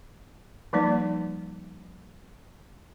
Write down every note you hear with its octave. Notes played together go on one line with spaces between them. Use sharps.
F3 G3 A#3 D#4 D5